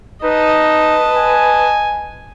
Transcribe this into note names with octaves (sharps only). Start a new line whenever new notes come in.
D#4 B4 D#5 A5
G#5